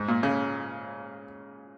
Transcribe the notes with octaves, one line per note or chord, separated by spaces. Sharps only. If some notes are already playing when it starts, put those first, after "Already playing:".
Already playing: G#2
A#2
C#3